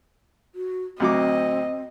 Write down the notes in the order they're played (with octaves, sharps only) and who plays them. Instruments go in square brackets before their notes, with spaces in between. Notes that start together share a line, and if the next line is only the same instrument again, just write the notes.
[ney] F#4
[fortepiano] D2 F#3 D6 [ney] C4 [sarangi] D#5